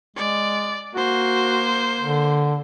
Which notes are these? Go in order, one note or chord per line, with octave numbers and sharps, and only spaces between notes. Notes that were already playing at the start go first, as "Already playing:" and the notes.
G#3 D5
A#3 F#4 C5
D3